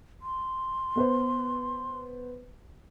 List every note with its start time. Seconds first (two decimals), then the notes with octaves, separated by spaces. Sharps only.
0.22 C6
0.96 B3 B4 C5